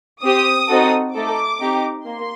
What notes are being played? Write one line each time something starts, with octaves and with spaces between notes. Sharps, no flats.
C4 G4 D#6
C4 D#4 F#4 A4
A3 D#4 A4 D6
C4 D#4 G4
A#3 C6